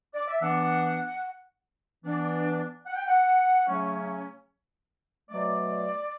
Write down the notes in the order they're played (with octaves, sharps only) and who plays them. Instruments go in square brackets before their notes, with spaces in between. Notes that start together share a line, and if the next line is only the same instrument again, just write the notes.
[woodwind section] D5
E5
E3 B3 D4 F#5
E3 B3 D4
F#5
G5
F#5
C#3 F#3 A3 C#4
B2 F#3 A3 D5